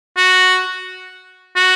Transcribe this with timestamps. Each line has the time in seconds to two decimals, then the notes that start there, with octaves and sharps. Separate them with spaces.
0.17 F#4
1.56 F#4